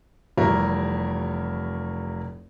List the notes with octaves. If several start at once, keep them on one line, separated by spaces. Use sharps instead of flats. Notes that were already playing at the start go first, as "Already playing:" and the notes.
F1 E3 G3 A#4 C#5 E5